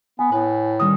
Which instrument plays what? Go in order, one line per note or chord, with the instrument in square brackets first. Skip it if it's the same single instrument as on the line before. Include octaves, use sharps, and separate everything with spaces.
[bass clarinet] B3 [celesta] G#5
[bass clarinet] A2 [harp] B4
[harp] D#3 G3 C#4 [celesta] D#6